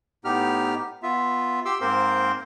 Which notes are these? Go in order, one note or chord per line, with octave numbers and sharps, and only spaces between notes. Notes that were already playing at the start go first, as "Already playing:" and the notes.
A2 B3 D#4 G4 F6
B3 F4 E5
G4 C6 D6 E6
G#2 A#3 C4 A#4 C5 C6